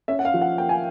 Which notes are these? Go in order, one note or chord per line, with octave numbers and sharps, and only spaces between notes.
C#4 E5
F#5
F5
F3
F#5
A#3 G5
G#5